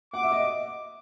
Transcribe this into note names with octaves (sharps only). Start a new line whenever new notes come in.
F#5 D6
E5
D#5